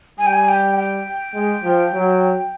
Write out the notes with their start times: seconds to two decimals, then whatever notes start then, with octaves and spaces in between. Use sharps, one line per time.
0.18 G3 G#5
0.27 G5
0.33 G#5
0.48 G5
0.77 G5
1.35 G#3
1.64 F3
1.93 F#3